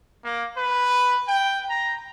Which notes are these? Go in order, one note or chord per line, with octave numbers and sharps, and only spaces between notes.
A#3
B4
G5
A#5